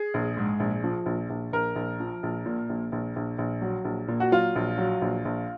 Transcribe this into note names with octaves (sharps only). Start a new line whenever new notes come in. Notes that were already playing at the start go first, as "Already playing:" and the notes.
Already playing: G#4
A#1
G#2
A#1
F3
A#1
A#1
A#1 A#4
A#1
F3
A#1
A#2
A#1
A#1
A#1
A#1
F#3
A#1
A#2
F#4
F#3 F4
A#1
F#3
A#1
A#1